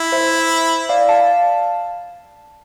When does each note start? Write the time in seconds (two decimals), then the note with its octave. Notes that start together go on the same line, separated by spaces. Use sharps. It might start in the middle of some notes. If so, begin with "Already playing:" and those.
Already playing: E4
0.12 C5 E5
0.89 D5 F5
1.09 F5 A5